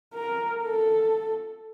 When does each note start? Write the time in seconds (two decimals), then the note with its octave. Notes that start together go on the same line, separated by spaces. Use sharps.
0.14 A#4
0.63 A4